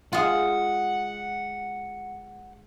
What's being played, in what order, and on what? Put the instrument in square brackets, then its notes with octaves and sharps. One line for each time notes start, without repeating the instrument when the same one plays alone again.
[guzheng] G#3 F4 [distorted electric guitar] F#5